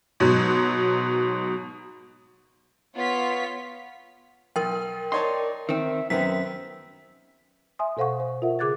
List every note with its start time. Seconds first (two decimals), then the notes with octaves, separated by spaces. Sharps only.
0.20 G#2 B2 F#3
2.96 B3 F4 C#5 B6
4.56 B1 A#4 G5
5.12 D#4 C#5 D5 A5 C6
5.69 D#3 C4 E5
6.10 F#2 D#3 B3 C4 E5 B6
7.79 E5 G#5 C6 D#6
7.97 B2 A4 C5 F5 F#5 C#6
8.20 C5
8.42 F4 A#4 E5 F#5
8.59 C#3 G#4 D6 F#6 G#6 A6